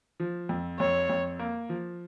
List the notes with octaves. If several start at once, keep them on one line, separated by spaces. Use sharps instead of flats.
F3
F2
F2 C#5
F2
A#3
F3